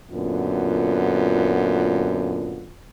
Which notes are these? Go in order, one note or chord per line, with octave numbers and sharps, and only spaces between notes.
F#2 A#2 D3 B3 F4